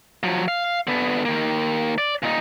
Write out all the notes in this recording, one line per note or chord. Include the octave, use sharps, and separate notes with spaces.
F3 F#3
F5
D3 B3
D#3 A#3
D5
A#2 D#4